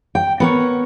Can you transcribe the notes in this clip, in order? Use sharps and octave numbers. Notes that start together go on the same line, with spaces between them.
G5
B3 A#4 C#5